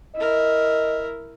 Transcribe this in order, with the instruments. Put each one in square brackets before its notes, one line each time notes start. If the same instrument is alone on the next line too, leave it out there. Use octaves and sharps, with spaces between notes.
[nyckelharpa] E4 A#4 [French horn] D#5